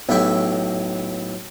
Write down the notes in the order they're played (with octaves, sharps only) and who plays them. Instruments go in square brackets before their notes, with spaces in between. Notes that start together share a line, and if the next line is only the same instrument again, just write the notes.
[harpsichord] B1 A2 G4 E5 C#6